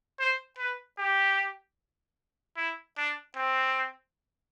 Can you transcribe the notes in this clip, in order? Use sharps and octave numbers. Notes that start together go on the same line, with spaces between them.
C5
B4
G4
E4
D4
C4